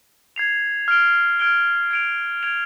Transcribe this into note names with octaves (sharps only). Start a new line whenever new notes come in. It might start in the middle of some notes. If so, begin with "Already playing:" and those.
G#6 C7 F7
F6 G#6 D7 G7
F6 G#6 D7 G7
G#6 D7 F7
G#6 D7 F7